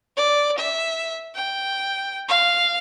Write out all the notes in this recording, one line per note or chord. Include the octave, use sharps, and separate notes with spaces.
D5
E5
G5
F5